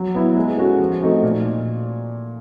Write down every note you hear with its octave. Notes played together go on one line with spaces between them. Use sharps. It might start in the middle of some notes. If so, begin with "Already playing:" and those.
Already playing: F#3
B3 E4
G#3
C#4 F#4 A4
F3
A3 C4 D#4 F#4
A#2